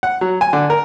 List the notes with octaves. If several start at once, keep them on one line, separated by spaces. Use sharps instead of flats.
F#5
F#3
G#5
D3
A#4